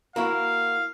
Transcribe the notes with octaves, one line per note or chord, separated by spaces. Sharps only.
A#3 E4 F#4 F5